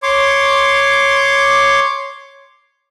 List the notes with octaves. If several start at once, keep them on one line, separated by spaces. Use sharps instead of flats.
C#5 C6 D6